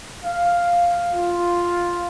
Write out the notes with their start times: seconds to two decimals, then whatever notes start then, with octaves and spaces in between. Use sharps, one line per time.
0.25 F5
1.14 F4